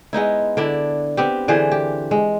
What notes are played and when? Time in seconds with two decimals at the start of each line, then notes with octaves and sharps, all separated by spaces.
0.13 G#3 B3 D#4 E4
0.57 D3 D4 E4
1.17 B3 C4 G4
1.48 D3 E3 G#4 C5
1.71 G4
2.11 G#3